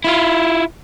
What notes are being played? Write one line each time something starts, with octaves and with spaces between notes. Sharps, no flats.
E4 F4